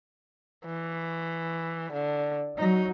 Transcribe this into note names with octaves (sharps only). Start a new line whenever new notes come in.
E3
D3
F#3 D#4